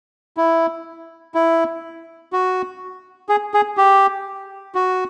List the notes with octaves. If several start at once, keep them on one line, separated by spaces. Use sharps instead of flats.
E4
E4
F#4
G#4
G#4
G4
F#4